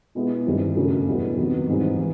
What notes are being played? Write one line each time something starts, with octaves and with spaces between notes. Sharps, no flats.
B2 G#3 B3 E4
G2 D#3 G3 C4 E4
F#2 C#3 F#3 A3 C#4
E2 B2 G3 B3 E4
C3 D#3 F#3 B3
G#2 E3 G3 C4 D#4
E3